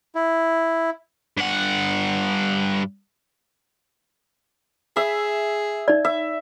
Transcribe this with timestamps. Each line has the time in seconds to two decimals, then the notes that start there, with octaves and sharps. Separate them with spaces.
0.15 E4
1.37 G2 F#5
4.97 G#4 E5
5.88 D#4 D5
6.05 E5